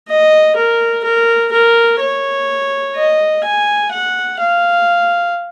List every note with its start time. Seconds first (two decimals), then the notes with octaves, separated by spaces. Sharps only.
0.08 D#5
0.56 A#4
1.04 A#4
1.52 A#4
2.00 C#5
2.96 D#5
3.44 G#5
3.92 F#5
4.40 F5